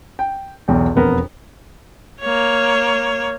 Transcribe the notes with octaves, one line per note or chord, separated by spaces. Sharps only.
G5
B1 E2 G5
E1 F2 B3 A#4
A#3 C#5